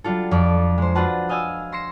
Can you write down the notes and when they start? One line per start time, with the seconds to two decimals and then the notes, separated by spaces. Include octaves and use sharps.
0.04 F#3 G3 D4 F4 A4
0.31 F2 D5 D6
0.78 G#3 C5
0.95 D4 F4 F#4 B4 F#5 A5
1.29 D#5 F5 G#5 D#6 E6
1.72 C6 A#6 C7 C#7 E7